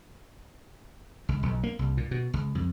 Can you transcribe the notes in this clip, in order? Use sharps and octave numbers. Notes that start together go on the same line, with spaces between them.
C#2
B1
A#3
C2
A#2
B2
C#2
F2